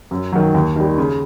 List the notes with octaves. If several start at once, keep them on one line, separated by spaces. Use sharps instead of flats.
F#2
D#3 F#3
D#2
D#3 G3
C#3